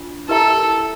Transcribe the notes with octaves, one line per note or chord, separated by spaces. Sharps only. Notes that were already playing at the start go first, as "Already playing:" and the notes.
Already playing: D4 F4
E4 G4 A4 A#4 E5 A#5